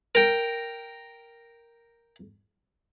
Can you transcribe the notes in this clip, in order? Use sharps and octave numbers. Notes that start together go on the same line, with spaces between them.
A#4 G5